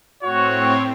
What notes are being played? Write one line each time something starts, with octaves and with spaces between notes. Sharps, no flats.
A2 C4 F#4 C#5